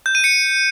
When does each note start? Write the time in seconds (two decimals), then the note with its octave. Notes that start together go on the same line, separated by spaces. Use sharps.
0.06 G6
0.15 D#7
0.24 C#7